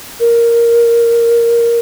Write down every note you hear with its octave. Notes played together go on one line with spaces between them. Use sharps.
A#4